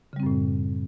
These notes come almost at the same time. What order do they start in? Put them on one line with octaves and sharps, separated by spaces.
C#3 G3 C4 F#2 A2